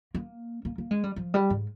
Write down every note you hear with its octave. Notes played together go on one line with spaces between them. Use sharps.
A#3
A#3
A#3
G#3
G3
F3
G3
G#2